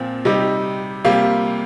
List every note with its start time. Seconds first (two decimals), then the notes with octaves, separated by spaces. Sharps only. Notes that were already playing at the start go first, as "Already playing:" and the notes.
Already playing: A#2 F3 C4
0.25 C3 G3 D#4
1.05 C3 G3 A#3 F4